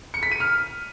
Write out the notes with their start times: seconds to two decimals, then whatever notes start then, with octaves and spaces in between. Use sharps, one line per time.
0.14 C#7
0.23 B6
0.32 D#7
0.40 F6